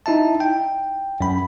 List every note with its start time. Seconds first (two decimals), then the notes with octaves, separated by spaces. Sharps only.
0.06 D#4 E4 E5 A5
0.40 G5
1.21 F#2 B5